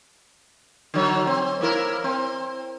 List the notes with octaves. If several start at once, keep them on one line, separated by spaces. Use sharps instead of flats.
D3 F#3 C#5
C4
A#3 E4 A#4
C4